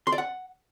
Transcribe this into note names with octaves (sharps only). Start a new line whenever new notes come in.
C6
D5
F#5